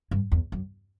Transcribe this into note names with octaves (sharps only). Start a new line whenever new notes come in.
G2
E2
F#2